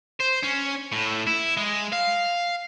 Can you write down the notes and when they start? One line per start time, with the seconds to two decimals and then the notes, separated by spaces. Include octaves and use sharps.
0.20 C5
0.44 C#4
0.92 A2
1.27 E4
1.57 G#3
1.93 F5